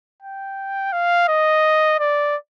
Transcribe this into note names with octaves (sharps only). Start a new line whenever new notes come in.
G5
F5
D#5
D5